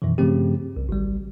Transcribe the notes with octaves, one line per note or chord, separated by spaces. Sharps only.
F#2 B2 D#3 E3
G2 C#3 F3 A3 C4 G4
C2
G#1 G3